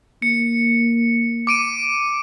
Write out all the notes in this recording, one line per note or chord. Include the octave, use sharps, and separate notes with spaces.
A#3 C#7
D6 D7 D#7